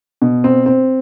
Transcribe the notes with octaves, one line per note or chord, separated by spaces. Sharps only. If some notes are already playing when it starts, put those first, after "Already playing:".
B2
C4
C4